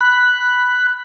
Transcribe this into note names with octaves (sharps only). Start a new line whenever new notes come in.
B5 F#6